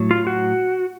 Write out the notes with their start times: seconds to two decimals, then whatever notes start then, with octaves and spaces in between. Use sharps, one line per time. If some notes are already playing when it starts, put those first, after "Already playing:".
Already playing: A2 F#3
0.11 F4
0.27 F#4